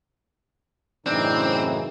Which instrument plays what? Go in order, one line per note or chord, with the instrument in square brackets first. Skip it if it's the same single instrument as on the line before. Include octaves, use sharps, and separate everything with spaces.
[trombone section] F#2 C#3 E3 [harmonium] A2 D#4 [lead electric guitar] C4 [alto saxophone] D4